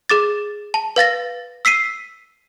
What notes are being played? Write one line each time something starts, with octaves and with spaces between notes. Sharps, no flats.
G#4 D6 A6
A5
B4 F5 A6 A#6
E6 B6 C7 D#7